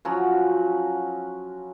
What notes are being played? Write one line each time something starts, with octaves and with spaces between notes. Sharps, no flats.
F3 F#3 C#4 F#4